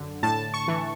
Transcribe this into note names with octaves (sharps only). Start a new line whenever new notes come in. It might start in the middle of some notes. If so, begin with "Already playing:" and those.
Already playing: F#2 D3
A2 A5
C#6
E3